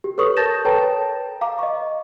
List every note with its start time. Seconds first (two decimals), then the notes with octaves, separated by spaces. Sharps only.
0.04 G4
0.18 A4 B4 C#5 C#6 D#6
0.37 A#4 A5 G6 A6 A#6 E7
0.65 A4 B4 C#5 G5 A5 A#5
1.41 F5 A#5 D6
1.59 D#5 C#6